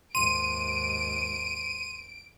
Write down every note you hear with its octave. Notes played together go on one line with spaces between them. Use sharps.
D#2 G#2 C6 D7 D#7